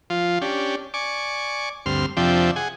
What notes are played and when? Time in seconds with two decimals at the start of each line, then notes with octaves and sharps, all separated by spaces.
0.10 F3 F4
0.42 C#4 D4 G4
0.94 D5 G#5 C#6 D6
1.86 D2 G2 C4 C6 F6
2.17 F2 C3 F3 D4 E5 G5
2.56 G#4 F#5 G#5